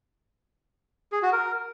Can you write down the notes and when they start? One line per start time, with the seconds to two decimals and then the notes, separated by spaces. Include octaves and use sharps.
1.12 G#4
1.23 F#4
1.33 A#4